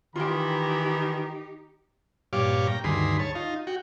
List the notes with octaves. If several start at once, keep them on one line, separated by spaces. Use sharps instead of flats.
D#3 E3 D#4 F4 G4 A#4 G5 B5
G2 A#2 G4 C#5 F5 D6
G5 A#5
D2 G2 D#3 G#4 B5 C6
C#5 A5
D#4 F4
F#4 G5